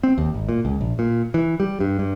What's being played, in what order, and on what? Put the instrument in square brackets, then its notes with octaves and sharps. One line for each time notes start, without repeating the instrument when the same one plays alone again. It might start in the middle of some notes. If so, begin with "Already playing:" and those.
[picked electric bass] C4
D#2
G#1
A#2
C#2
A#1
A#2
E3
G3
G2
G2